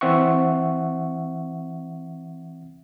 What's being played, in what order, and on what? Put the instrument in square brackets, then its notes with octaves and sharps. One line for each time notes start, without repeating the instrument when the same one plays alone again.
[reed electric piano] E3 C4 E5 F#5 C#6